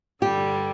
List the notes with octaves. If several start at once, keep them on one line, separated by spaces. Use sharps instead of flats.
G2 D3 G3 G4